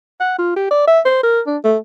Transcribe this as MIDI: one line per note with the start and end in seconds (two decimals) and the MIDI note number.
0.20 0.37 78
0.38 0.51 65
0.56 0.69 67
0.71 0.85 74
0.87 1.00 76
1.05 1.22 72
1.23 1.40 70
1.47 1.57 62
1.64 1.77 57